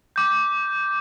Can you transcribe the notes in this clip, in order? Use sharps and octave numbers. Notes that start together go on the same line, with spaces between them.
D6 G6